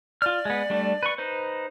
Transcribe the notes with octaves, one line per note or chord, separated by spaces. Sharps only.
F4 D5 F6
G#3 B3
G3 A3 D4
B4 C#6
D#4 B4 C5